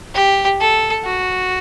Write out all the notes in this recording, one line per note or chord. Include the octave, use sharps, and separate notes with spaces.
G4
A4
F#4